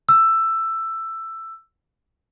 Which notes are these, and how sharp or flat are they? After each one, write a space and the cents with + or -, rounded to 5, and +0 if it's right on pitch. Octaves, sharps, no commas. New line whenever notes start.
E6 +10